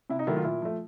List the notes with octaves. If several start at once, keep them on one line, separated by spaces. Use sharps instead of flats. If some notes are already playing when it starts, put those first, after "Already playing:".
C3 E4
D#4
D#3 F#3 A3 E4
F4
A#2 E4
F3 A3